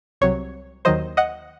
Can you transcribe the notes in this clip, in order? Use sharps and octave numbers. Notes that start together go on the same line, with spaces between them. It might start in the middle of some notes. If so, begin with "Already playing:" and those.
C2 C3 F#3 C#5
D#2 D#3 F#3 C5 D#5
D#5 F#5